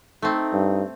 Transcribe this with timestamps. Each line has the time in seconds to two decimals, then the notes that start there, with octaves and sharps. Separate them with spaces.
0.22 A3 C4 D#4
0.53 G2